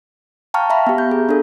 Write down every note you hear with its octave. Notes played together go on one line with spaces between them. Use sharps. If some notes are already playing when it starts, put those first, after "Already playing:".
F5 G5 A5 A#5 C#6 F6
E5 F5 A#5 B5
B3 G4
G6
G#4
D4 A4